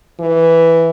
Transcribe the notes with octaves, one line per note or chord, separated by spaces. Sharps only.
E3